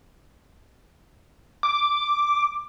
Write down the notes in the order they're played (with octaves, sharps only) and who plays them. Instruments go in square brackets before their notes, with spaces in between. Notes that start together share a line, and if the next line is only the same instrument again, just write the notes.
[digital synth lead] D6